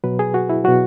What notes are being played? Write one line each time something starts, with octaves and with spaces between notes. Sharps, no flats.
B2 F#3 B4
G#4
F#4
E4
B2 F#3 F#4